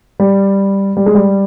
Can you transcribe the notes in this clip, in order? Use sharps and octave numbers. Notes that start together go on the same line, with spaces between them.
G3
G3
G#3
G3